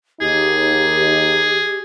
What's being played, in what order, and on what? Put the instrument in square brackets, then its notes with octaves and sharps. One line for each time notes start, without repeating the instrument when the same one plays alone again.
[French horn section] D#2 D#3 D#4 [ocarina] G4 [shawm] G#4